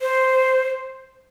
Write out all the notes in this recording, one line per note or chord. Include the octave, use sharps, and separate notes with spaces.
C5